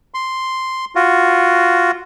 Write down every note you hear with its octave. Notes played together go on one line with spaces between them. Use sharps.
C6
F4 F#4